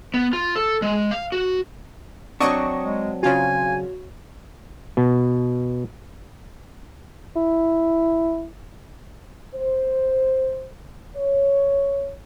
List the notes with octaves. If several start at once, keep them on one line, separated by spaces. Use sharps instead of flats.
B3
F4
A4
G#3
F5
F#4
F#3 C4 D4 D#5 F#5 C#6
G#3
C#3 F4 F#4 C#5 G#5
B2
E4
C5
C#5